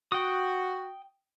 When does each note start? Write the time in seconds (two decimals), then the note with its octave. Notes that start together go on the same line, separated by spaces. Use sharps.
0.12 F#4 G5 D#6